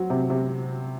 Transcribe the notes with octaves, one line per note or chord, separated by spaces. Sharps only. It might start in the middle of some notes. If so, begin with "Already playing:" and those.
Already playing: F#3 C4
C3
C3